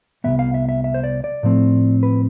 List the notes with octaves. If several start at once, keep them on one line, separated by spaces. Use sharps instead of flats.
C2 B2 B3 E5
F5
E5
E5
E5
C5
D5
D5
A2 F3 A3 C4
B4